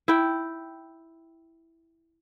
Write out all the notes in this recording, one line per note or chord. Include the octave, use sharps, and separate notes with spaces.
E4 G5